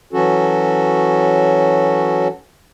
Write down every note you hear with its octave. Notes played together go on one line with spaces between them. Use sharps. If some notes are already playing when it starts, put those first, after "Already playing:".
E3 F#3 C#4 F#4 A4